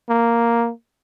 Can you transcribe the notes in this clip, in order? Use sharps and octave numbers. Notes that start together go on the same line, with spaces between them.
A#3